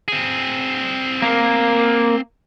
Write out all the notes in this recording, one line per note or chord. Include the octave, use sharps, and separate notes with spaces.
C4 G#4
A#3